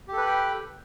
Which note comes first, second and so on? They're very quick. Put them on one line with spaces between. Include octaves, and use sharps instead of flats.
G4 A4 B4 B5 G5